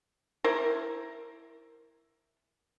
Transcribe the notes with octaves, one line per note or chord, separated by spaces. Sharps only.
E4 A#4 C5